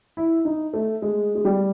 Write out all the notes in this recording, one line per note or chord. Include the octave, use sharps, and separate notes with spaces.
E4
D#4
A3
G#3
G#3
G3